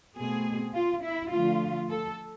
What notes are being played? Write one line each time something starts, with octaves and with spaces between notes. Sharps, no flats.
B2 A3 C4 G#4
F4
E4
D3 F3 A3 F4
A4